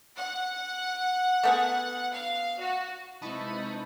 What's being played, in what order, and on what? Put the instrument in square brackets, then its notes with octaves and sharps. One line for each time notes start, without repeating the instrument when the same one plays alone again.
[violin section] F#5
[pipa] A3 B3 G#4
[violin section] F5
F#4
[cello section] C3 G#3 B4 [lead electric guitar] D#4 [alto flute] E4 [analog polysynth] A5 B5 C#6